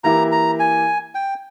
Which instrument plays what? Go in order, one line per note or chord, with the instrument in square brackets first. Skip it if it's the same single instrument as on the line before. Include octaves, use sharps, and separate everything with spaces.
[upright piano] E3 A#3 E4 G4 [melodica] A#5
[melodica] A#5
G#5
G5